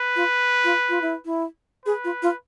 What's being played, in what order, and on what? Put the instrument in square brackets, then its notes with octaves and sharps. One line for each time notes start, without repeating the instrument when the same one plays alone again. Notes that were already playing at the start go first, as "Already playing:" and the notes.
Already playing: [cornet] B4
[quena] F4
F4
F4
E4
E4
[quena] G#4 [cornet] B4
[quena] F4
F4